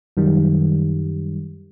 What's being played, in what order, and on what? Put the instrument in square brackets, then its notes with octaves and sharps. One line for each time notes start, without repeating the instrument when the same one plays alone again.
[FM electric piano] F#2 D#3 G3